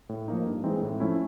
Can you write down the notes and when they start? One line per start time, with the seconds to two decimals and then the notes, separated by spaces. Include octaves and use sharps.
0.09 A2
0.28 F3 A#3 D#4
0.46 G2
0.64 E3 G#3 C4 D#4
0.82 A2
1.00 F3 A3 C#4 E4